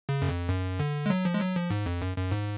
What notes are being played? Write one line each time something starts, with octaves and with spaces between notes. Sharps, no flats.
C#3
F#2
F2
F#2
D3
G#3
F#3
F3
G#3
F#3
F3
G#2
F2
F#2
F#2
G#2